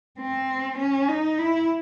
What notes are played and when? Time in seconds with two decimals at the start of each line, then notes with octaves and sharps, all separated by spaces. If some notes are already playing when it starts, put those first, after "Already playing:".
0.19 C4
0.79 C#4
1.09 D#4
1.39 E4